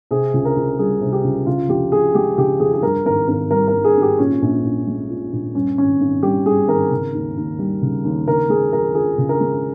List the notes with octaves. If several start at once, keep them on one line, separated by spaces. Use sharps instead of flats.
C3 G#4
C#2
A#4
C#2
G3 G#4
C3
G4
C#2
C#3 F4
F2 G4
F2 G#4
G#3 G4
C#3 G4
F2 G#4
G#4
G2 A#4
G#1 A#4
G#1 A#4
G3 A#4
A#4
G2
G#4
G#1 G4
A#2 C#4
A#1
A#1
G#3
A#2
A#1
G2 C#4
G#1 C#4
G#1
G3 G4
G2 G#4
G#1 A#4
C#3
D#2
D#2
G3
C#3
D#2
C#3 A#4
G#3 G#4
F2 A#4
F3 G#4
C#3
A#4
G#3